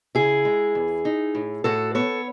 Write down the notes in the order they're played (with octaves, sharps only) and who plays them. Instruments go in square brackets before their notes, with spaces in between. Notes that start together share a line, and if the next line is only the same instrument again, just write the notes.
[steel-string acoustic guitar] C#3 E4 G#4
G#3
E2
D#4
A2
A2 F#4 A4
B3 A4 C#5